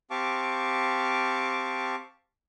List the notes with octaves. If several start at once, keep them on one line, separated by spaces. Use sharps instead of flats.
C4 G4 F5 A5 C#6 D6